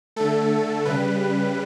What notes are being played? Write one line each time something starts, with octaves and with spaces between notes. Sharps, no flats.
D3 A3 A4
C#3 G3 B4